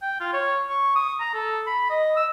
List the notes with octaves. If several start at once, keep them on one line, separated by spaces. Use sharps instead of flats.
G5
F4
C#5
C#6
D#6
A#5
A4
B5
D#5
E6